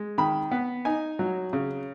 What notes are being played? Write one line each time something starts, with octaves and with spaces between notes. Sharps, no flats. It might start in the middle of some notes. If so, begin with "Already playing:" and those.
Already playing: G#3
D#3 B5
B3
D#4 G#5
F#3
C#3